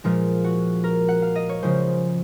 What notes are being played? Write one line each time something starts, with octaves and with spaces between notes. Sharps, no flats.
A#2 F3 G#3 F4
F#4
A#4
F#5
F5
D#5
C#5
C#3 F3 G#3 C5